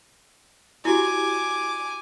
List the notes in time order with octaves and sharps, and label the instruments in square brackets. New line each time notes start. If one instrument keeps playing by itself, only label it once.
[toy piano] E4 F#4 G4 [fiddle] G#5 D6